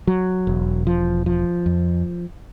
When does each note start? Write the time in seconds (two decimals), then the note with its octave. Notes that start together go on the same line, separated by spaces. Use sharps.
0.07 F#3
0.47 E1
0.87 F3
1.26 F3
1.66 F2